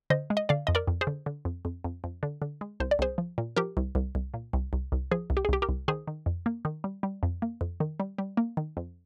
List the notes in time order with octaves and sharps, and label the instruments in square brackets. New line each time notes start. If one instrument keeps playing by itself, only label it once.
[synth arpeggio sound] D3 C5 D#5
G#3
D#5
D3 D5 F5
F2 D#5
A#4 D5
F2
G#4 C5
D3
D3
F2
F2
F2
F2
D3
D3
G#3
C2 C5
D5
C2 G#4 C5
F3
A#2
F3 G4 A#4
C2
C2
C2
A#2
C2
C2
C2
F3 G#4
C2
G4
G#4
C2 G4
G4 A#4
C2
D#3 G#4 C5
D#3
F2
A#3
D#3
G3
G3
F2
A#3
F2
D#3
G3
G3
A#3
D#3
F2